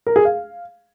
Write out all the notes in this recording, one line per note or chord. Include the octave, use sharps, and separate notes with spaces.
A#4
G#4
F5